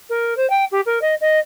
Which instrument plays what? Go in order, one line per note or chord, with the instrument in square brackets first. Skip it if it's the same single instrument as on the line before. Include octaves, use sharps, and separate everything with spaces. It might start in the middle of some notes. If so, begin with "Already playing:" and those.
[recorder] A#4
C5
G5
G4
A#4
D#5
D#5